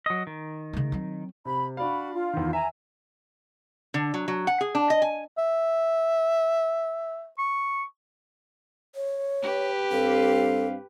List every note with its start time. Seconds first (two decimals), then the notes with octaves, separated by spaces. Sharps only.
0.06 F#3 D#5
0.27 D#3
0.73 C#3 A3
0.92 F#3 C4
1.45 C3 B5
1.77 D4 F#4 D5 F5 B5
2.13 F4
2.33 E2 D#3
2.53 E5 G#5 A#5
3.94 D3
4.14 F#3
4.28 F#3
4.47 F#5
4.61 G#4
4.75 D4
4.90 D#5
5.02 G#5
5.38 E5
7.38 C#6
8.95 C#5
9.42 G4 B4
9.92 G2 C4 A4 F5